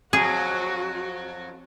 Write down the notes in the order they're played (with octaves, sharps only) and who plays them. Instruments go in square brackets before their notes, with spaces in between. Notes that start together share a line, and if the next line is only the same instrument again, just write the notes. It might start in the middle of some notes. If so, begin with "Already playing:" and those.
[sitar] F2 F#3 [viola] F#4 [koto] G#4